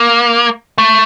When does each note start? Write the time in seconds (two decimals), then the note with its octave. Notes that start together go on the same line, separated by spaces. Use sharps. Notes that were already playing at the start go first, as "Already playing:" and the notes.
Already playing: A#3
0.78 A3